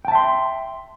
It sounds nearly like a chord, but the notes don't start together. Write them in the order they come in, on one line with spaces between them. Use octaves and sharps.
G5 A5 E5 C6